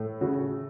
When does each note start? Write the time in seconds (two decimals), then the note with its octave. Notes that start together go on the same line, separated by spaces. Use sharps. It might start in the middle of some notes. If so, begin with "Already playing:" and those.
Already playing: A2 A3
0.21 C#3 F#4